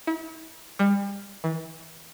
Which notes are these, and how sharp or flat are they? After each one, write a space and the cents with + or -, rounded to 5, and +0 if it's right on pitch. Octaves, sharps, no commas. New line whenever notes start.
E4 -35
G3 +35
E3 -30